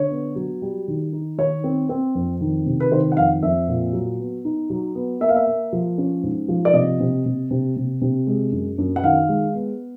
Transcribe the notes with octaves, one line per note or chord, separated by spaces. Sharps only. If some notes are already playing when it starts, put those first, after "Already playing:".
Already playing: D3 C#5
B3
F#3
G3
D#3
D#4
D#3 C#5
C4
C4
F2
D#3
C3
B4
D#3 C5
F#5
F2 F5
F2 E5
A#2
F#3
B3
D#4
F#3
B3
A#3 E5
F5
E5
A#3
F3
C#4
G#2
F3
D5
C3 D#5
C3
C3
C3
C3
C3
G#3
F#2
F#2
F#5
D#3 F5
G#3
B3